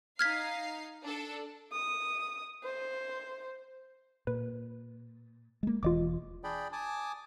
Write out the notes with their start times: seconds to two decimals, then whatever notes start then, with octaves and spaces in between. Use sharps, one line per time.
0.19 D#4 F5 F6 G#6 B6 C7
1.05 D4 A4
1.73 D#6
2.64 C5
4.27 A#2 B4
5.63 G#3 A#3
5.83 E1 E3 F4 D#5 D6
6.44 D4 G#4 D5 G5 B5
6.73 G#5 A5 D6 D#6